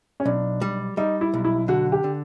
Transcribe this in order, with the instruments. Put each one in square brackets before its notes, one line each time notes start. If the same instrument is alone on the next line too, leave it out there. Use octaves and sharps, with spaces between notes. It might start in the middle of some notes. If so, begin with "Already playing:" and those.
[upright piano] C#4
[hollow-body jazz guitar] B1 [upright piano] D4
[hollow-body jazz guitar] G3
[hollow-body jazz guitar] G3 [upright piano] D#4
[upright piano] E4
[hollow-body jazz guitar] B1
[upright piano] E4
[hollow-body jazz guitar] D3 [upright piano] F#4
[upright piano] G4
[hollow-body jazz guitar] D3